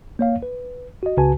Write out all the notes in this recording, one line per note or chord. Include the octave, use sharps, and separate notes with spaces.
A#3 C#5 F5
B4
F#4 D#5
C#2 C#3 F#4 B4 G#5 A5